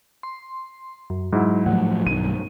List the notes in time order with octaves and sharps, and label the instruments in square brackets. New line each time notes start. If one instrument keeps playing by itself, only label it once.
[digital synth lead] C6
F#2
[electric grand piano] G#2 E4 [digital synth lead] F#3
[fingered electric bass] A2 F3 G3 [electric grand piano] F#5
[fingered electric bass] B1 G2 D#3 [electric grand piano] D#7